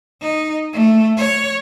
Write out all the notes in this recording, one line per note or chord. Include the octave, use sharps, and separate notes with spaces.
D#4
A3
C#5